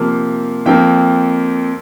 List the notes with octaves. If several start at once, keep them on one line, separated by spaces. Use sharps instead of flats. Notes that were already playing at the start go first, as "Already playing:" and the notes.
Already playing: C3 F3 A#3
F2 F3 A#3 G5